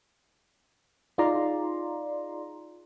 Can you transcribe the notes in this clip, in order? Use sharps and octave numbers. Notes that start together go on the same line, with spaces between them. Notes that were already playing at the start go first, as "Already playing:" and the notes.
D#4 F4 G#4 D5 A#5 C6